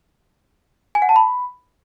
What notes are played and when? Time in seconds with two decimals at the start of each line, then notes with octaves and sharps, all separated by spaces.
0.95 G#5
1.02 F#5
1.09 A5
1.16 B5